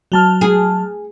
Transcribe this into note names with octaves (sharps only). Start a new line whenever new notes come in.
F#3 A5 F6
G#4